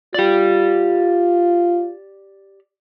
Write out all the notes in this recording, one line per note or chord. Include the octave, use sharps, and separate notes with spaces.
F4 G4 D5